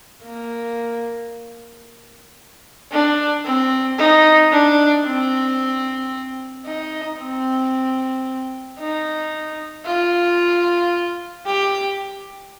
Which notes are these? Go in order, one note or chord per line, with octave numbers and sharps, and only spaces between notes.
A#3
D4
C4
D#4
D4
C4
D#4
C4
D#4
F4
G4